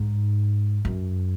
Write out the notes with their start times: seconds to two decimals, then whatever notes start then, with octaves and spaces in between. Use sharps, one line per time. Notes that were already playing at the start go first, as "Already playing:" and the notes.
Already playing: G#2
0.85 F#2